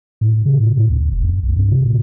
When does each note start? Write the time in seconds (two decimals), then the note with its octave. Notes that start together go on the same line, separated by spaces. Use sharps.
0.21 A2
0.45 C#3
0.60 A2
0.77 A2
0.90 D2
1.12 F1
1.23 F2
1.43 B1
1.56 G2
1.71 C3
1.85 A#2